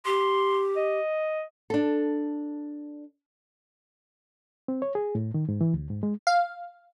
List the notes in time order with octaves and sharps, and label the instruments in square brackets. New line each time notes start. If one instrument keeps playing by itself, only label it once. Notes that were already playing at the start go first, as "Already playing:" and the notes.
[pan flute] G4 [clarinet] C6
[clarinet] D#5
[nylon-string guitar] D4 A4
[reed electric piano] C4
C#5
G#4
A2
D#3
G#2
E3
D2
G#2
G#3
[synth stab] F5